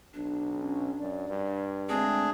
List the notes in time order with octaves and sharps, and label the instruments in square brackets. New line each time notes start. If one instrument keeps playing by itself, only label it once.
[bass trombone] B1 [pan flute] D4
[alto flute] C#4
[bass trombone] F#2 [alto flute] D5
[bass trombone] G2
[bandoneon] D2 D4 G#4 [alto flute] G#3 [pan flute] C4